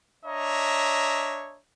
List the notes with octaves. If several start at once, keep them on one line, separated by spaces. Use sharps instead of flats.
D4 C#5 D#5 E5 A#5